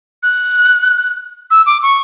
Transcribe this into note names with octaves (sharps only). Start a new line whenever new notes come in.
F#6
E6
D6
C#6